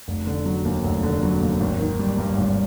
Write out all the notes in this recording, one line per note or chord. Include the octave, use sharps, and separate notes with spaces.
F1
D3
F#3
D#2
F1
D3
F#3
D#2
G#1
D#3
G3
G2
G#1